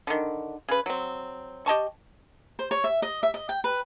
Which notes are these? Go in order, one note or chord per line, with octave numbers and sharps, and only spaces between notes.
D3 D#3
C#3 B4
F#3 C4
G4 D#5 A5 C#6
C5
C#5
E5
D#5
E5
D#5
G5
B4